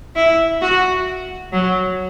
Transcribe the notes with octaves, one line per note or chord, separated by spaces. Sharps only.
E4
F#4
F#3